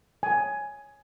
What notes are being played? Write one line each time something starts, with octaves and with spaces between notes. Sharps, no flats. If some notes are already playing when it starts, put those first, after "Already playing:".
G#5